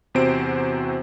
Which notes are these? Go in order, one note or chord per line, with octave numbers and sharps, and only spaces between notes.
E2 C3 C4 F#4 C5 D7